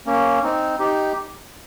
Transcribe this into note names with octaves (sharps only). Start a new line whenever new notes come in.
A#3 C#4
C4 D#4
D#4 G4